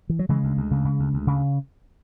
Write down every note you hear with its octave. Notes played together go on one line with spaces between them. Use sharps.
E3
F#3
C#3 E3 G#3
D2
D2
C#3
C#3
D2
D2
C#3